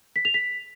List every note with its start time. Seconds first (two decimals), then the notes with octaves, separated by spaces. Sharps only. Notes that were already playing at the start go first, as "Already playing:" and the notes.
0.16 B6
0.25 F7
0.34 B6